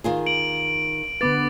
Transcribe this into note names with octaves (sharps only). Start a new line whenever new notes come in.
D#3 F4 G#4
D7 F#7
D3 B3 B4 D6 A6